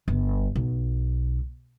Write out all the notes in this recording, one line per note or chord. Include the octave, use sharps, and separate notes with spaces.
G1
B1